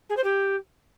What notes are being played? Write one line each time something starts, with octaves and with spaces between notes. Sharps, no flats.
G#4
C5
G4